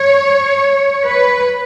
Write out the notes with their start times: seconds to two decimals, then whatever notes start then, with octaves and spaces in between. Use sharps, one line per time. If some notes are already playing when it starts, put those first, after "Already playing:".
Already playing: C#5
1.05 B4